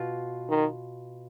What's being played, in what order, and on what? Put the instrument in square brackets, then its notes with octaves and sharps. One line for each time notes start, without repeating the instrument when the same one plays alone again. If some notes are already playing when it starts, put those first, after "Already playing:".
Already playing: [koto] B2 F4
[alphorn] D#3